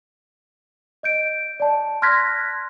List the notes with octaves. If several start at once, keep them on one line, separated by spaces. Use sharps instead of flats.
D#5 G6 D7
D5 A5
C6 F6 F#6 G#6 A#6 B6